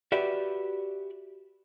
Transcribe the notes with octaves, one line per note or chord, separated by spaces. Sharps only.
F#4 G4 B4 D5 E5